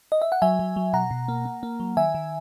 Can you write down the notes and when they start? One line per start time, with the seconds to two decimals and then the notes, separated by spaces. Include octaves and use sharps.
0.12 D#5
0.22 E5
0.32 F#5
0.42 F#3 E5 G#5
0.59 F#3
0.76 F#3
0.93 B2 F#5 A#5
1.11 B2
1.28 A#3
1.45 A#3
1.63 A#3
1.80 F#3
1.97 D#3 E5 G#5
2.14 D#3